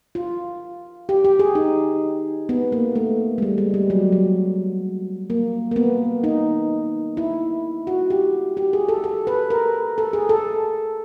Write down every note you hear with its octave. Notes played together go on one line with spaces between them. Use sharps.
F4
G4
G4
G#4
D#4
B3
A#3
A3
G#3
G3
G#3
G3
F#3
F#3
A#3
A#3
B3
D#4
E4
F#4
G4
G4
G#4
A4
A4
B4
A#4
A4
G#4
A4